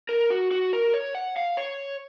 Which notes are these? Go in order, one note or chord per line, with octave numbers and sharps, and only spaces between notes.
A#4
F#4
F#4
A#4
C#5
F#5
F5
C#5